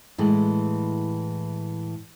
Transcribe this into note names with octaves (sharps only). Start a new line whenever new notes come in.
A2 E3 G#3